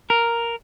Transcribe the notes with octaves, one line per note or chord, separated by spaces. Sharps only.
A#4